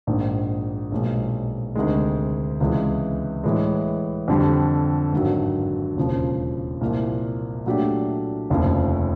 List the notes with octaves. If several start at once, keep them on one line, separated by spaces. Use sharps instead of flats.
A#1 G#2 D#3
B1 A#2 F3 G#3
D2 C3 D#3 G#3
C#2 C3 E3 G#3
A2 E3 G#3
F2 D3 G3
G#1 G2 D#3 F#3
E1 D#2 C#3 F3
C2 A#2 F3
A#2 F#3 A3 D4 G4
F1 D#2 C#3 F3